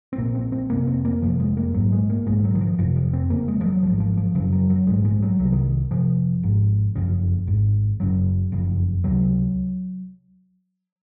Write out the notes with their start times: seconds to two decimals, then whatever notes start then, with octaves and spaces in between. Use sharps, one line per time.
0.13 C4
0.18 A#1 A#2 A#3
0.35 C4
0.52 C4
0.70 F1 F2 C3 A#3
0.87 C4
1.05 A#3
1.22 F1 F2 C3 F3
1.40 G#3
1.57 A#3
1.74 A#1 G#2 F#3
1.92 G#3
2.10 A#3
2.26 A#1 G#2 G#3
2.44 F#3
2.55 D#3
2.61 F3
2.78 F1 F2 C3 F3
2.96 F3
3.13 C4
3.30 F1 F2 C#3 A#3
3.48 G#3
3.61 F3
3.66 F#3
3.83 G#1 G#2 F3
4.00 F3
4.17 F3
4.35 F#1 F#2 C#3 F#3
4.53 F#3
4.70 F#3
4.87 A#1 G#2 G#3
5.05 G#3
5.22 F#3
5.39 C2 C3 F#3
5.52 D#3
5.91 F1 F2 C3 F3
6.43 G#1 G#2
6.96 F#1 F2 C#3
7.47 G#1 G#2
8.00 F#1 F#2 C#3 F#3
8.52 F#1 F2 C#3
9.04 C#2 C3 F#3